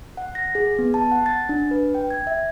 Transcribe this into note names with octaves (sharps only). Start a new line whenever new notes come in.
F#5
A#6
G#4
B3
A5
F#5
A6
D4
B4
G5
G#6
E5